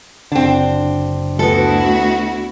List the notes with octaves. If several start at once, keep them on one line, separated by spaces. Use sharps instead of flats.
F#1 D3 C4 D4
D2 B3 E4 F#4 A4